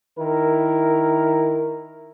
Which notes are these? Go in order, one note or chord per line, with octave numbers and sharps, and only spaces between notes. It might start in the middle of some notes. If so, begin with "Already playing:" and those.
D#3 E4 A#4